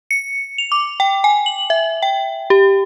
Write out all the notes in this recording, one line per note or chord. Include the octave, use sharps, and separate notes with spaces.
C#7
F7
D6
G5
G#5
F#7
E5
G5
G4